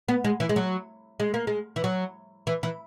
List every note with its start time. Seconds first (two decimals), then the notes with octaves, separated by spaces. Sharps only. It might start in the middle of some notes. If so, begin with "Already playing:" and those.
0.08 B3
0.24 G#3
0.40 E3
0.49 G#3
0.56 F#3
1.20 G#3
1.34 A#3
1.47 G#3
1.76 E3
1.84 F#3
2.47 E3
2.63 E3